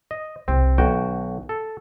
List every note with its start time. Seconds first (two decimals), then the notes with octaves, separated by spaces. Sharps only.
0.11 D#5
0.48 C2 C4
0.78 B1 D#3 F#4 G5
1.49 A4